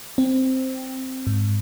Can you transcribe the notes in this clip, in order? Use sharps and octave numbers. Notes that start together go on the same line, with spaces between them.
C4
G#2